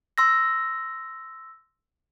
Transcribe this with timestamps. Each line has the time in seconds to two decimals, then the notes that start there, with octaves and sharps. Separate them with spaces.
0.18 C6 E6 A#6